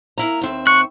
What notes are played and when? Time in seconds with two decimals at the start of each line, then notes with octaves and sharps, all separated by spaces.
0.18 A#3 E4 A#5
0.41 D#2 C4 E5
0.67 C#6 F#6